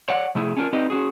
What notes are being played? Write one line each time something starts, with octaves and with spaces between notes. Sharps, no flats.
C#5 D5 F#5
C3 F3 A3 E4 G#4
C#4 D4 F4 F#4 A#4
C4 D#4 G4 B4 D5 D#5
C#4 F#4 G#4